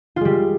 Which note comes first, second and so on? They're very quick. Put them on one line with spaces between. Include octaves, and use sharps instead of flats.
F4 G#3 G3